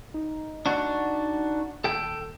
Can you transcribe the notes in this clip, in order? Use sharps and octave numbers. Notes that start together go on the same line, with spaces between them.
D#4
D4 F#4
D#1 A4 G5